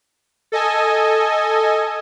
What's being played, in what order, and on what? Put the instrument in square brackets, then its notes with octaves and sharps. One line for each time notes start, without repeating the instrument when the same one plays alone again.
[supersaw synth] A4 D#5 G#5